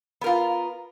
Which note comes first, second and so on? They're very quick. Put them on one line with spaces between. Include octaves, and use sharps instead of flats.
B3 A#4 F4